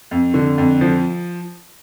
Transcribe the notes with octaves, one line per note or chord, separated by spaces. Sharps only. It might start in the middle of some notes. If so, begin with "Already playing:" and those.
F2
D3
F2
F3